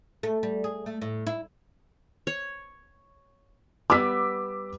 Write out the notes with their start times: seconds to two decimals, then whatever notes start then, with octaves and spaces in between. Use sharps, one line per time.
0.23 A3
0.43 G3
0.64 G#4
0.86 A3
1.02 A2
1.27 E4
2.27 C#5
3.90 G3 B3 D6 E6 B6